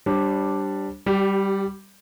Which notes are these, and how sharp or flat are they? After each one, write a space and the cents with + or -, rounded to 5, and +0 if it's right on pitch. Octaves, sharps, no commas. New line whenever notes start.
G3 -5 D4 +0 C5 +40
G3 +0 G4 -35